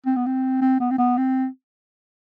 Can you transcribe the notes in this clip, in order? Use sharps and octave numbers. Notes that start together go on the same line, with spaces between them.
C4
B3
C4
C4
B3
C4
B3
C4